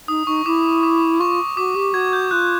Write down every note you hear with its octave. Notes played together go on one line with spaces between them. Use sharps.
D#4 D#6
D#4 C#6
E4 D6
D6
F4 C#6
F#4 D6
G4
F#4 G#6
G6
F4 F#6